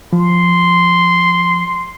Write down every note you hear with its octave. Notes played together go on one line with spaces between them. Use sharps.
F3 C6